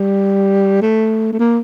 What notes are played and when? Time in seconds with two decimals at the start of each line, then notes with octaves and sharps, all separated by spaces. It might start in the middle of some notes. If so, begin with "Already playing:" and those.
Already playing: G3
0.82 A3
1.33 A3
1.39 A#3